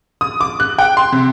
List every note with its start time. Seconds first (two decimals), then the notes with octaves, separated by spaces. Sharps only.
0.21 D#6
0.41 D6
0.60 F#6
0.79 G5
0.97 C6
1.12 C3